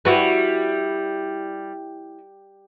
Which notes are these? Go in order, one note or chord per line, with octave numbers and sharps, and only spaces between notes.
G3 E4 F#4 B4